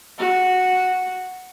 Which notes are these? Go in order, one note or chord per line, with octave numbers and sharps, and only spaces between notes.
F#4